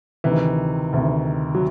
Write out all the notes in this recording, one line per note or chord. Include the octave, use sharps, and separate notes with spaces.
D2 C3 D#3 E3
D2 C3 D#3
F#3